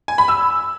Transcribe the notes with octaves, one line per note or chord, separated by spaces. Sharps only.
G#5
B5
E6